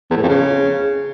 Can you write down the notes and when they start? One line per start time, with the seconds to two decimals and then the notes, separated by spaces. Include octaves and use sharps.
0.11 E2
0.16 A2
0.22 F2
0.28 C#3